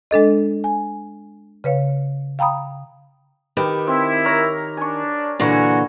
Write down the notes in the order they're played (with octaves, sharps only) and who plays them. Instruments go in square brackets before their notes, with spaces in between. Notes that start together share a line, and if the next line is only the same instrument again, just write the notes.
[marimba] G#3 D4 A4 D#5
G#5
C#3 B4 C#5 F5
F5 G5 A#5 B5 D#6
[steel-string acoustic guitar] D#3 [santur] G4 B4
[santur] C4 [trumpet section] E4
[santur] A#4 C#5 A#5
[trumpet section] D4 [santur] G#5 C#6
[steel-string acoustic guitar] A#2 D3 E3 [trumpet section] F#4 G#5 [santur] A#5 C#6